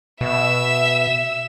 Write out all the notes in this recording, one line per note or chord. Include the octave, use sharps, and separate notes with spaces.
B2 E5 E6